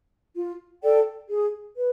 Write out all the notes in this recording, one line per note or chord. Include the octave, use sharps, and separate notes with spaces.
F4
A4 D5 G5
G#4
B4